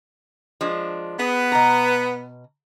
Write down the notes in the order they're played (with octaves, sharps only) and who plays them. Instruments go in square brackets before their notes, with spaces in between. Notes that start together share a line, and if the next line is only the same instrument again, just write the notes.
[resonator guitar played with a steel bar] F3 G#3 D4
[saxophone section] B3 [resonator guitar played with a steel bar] G#4
[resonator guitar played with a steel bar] B2 A#5